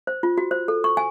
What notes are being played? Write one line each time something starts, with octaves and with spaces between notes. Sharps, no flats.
C5
F4
F#4
C5
A4
C#6
G#5